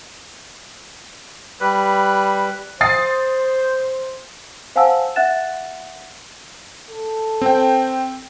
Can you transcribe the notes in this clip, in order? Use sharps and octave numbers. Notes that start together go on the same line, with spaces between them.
G3 B4
C5 D#6 A6 C7
C5 F5 F#5 G#5 A5 E6
E5 F#5 F#6 A6 E7
A4
C4 G5